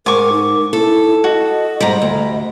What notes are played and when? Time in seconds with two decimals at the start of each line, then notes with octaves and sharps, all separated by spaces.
0.06 G#2 A#4 G#5 C#6 D6
0.32 D#4
0.73 E4 A4
1.24 F#4 D#5
1.80 G#2 G3 A#5 B5
2.02 D2